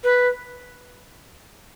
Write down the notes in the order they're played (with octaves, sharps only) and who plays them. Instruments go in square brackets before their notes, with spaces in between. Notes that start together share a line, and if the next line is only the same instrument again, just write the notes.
[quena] B4